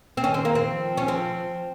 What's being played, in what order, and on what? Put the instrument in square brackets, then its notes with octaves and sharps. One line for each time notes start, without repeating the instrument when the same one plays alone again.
[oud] C4
[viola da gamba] D#3 [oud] C#4
[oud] C4
A#3
C4
[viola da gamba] F3
[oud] C#4
C4